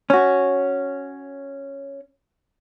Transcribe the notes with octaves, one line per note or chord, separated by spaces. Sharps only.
C#4 F#4